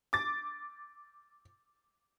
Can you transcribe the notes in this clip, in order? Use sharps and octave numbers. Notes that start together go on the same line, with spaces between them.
D6 A6